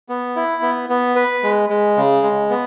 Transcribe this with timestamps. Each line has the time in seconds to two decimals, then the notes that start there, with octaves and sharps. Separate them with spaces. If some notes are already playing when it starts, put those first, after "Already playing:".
0.09 B3
0.36 E4
0.62 B3
0.89 B3
1.16 B4
1.43 G#3
1.69 G#3
1.97 C#3
2.23 G#3
2.50 B3